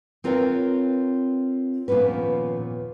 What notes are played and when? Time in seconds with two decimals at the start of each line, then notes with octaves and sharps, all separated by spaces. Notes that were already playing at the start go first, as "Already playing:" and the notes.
0.24 C4 F4 A#4 B4 C#5 G5
1.88 D#2 A#2 F3 B3 C#4 B4